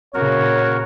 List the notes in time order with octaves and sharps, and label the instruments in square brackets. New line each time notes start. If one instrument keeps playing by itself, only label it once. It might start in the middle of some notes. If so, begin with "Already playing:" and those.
[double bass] A#2 C#3 [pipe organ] F#4 A#4 [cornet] C#5